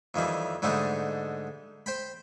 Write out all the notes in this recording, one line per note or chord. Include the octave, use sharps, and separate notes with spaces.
F2 D#3 E3 G3
G#2 D3 G3 A3 D#4
C5 G5 B5